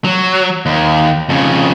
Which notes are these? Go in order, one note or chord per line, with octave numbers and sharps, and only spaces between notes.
F#3
D#2
F2 C#3